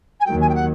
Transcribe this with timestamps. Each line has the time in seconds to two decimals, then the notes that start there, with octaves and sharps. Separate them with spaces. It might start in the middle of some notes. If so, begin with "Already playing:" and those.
0.20 G#5
0.26 D#2 D#3 F#3 G5
0.40 G#5
0.49 G5
0.55 F#5